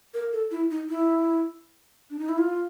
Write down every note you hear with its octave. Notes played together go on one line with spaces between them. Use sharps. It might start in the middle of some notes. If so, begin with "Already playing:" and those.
A#4
A4
E4
D#4
E4
D4
D#4
E4
F4